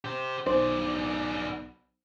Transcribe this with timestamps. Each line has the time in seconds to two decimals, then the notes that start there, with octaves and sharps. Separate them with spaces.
0.05 G4 C5
0.47 B1 B3 C5 D5